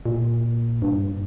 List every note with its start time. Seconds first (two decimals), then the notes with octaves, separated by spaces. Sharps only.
0.06 A#2
0.82 G2